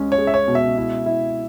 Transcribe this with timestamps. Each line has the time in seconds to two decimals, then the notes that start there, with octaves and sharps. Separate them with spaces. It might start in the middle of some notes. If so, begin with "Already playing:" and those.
Already playing: C#2 G#3 C#4
0.12 C#5
0.18 G#3
0.27 E5
0.34 C#5
0.48 B2
0.55 E5
0.77 E4
1.06 E4